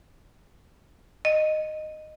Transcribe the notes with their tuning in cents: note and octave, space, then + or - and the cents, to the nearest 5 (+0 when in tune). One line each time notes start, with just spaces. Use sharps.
D#5 -10